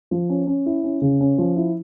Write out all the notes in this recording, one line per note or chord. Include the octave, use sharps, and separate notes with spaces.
F3
C#4
C#4
E4
C#4
C#3
C#4
F3
E4